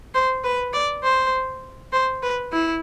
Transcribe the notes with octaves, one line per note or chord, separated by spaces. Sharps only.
C5
B4
D5
C5
C5
B4
E4